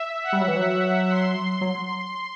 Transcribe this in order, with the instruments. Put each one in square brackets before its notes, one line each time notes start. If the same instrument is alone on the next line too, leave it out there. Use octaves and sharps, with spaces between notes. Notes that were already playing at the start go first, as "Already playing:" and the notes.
Already playing: [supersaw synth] E5
F#5
[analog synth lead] G3
F#3
E3
F#3
[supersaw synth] C6
[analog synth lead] F#3